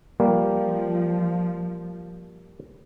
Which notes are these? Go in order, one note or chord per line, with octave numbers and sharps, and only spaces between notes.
F3 G3 A#3